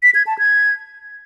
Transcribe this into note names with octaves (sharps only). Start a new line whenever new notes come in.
B6
G#6
A5
G#6